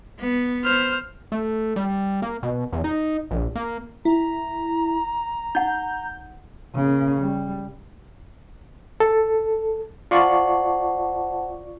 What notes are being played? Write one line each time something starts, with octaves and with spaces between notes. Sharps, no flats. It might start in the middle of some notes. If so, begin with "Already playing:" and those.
B3
C5 F6
A3
G3
A#3
B2
E2
D#4
A#1
A#3
E4 A#5
D#4 F#5 G6
C#3 A#3
G3
A4
F4 C5 D5 F#5 A5 C#6